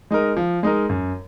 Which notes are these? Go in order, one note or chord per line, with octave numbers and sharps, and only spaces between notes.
G#3 D#4 A#4
F3
G#3 D#4 A#4
F#2